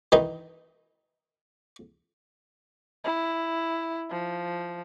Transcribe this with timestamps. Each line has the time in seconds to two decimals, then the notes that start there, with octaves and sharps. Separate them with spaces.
0.12 D#3 E3 D#4
3.04 E4
4.10 F3